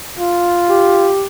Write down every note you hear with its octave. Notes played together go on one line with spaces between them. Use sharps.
F4
G4